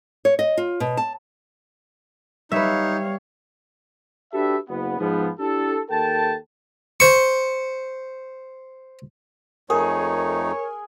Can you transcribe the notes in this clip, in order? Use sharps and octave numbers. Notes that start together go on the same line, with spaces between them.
C#5
D#5
F4
B2
A5
G3 D#4 B4 C#5 E5 F5
D4 F#4 G4 A4 B4 E5
F#1 B3
G#2 F3 B3
D4 E4 G4 A4
D#2 A4 A#4 G5 A5
C5 C#6
F2 A3 D#4 G#4 A#4 C#5